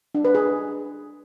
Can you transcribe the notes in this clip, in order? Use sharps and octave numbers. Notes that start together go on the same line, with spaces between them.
D4
B4
G#4